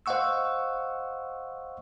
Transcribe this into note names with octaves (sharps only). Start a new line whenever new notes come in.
C5 D#5 F5 F#5 C#6 E6